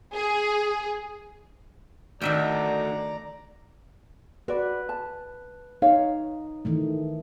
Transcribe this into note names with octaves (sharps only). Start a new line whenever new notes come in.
G#4
D2 D#3 D5 E5 G5 A#5
F#4 B4 D5
A5
D#4 C#5 F5
D#3 E3 A3